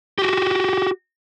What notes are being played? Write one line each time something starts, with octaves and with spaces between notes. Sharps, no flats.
F#4 G4